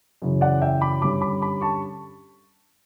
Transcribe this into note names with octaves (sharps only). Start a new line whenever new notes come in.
F#2 C#3 E3
D5 F#5
E5 G5
B5 D6
G2 D3 G3 C#4 B5 D6
B5 D6
B5 D6
A5 C#6